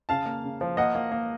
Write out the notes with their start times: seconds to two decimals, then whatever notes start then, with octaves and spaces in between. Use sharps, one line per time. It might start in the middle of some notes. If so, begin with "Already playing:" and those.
0.09 C#3 F5 A5
0.26 A#3
0.44 C#3
0.61 F3
0.77 A#3 D#5 F#5
0.95 A#3
1.12 A#3